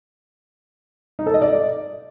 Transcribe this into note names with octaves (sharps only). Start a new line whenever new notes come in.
D#4
A4
D#5
D5